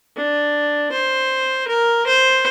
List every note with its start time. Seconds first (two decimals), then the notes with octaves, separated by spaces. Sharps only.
0.16 D4
0.92 C5
1.68 A#4
2.07 C5